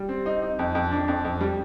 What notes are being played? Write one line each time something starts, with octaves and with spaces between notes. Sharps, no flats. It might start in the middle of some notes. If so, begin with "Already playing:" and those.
Already playing: G3
C4
D#4
D#4
F2
F2
D4
F2
F2
G3